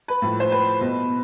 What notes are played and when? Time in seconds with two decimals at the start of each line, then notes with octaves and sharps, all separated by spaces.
0.08 B4
0.22 A2 F3
0.40 C5
0.52 B4
0.81 B2